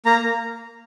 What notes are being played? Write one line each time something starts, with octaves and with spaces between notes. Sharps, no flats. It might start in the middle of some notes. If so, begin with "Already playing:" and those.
A#3 A#5